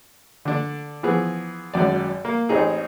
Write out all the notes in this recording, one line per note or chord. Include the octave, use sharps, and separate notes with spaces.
D3 D4
E3 F3 B3 G#4
G#1 F#2 D5
A#3
A1 C4 D#4 G#4